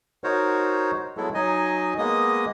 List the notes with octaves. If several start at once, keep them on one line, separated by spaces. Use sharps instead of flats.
D#4 F#4 A#4 C5 C#5
F#3 G#3 B3 E4 A4
F#3 D#4 D#5 G#5
G#3 A#3 B3 D#5 D#6